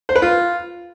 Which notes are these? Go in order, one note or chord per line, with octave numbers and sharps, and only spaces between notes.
C5
B4
F4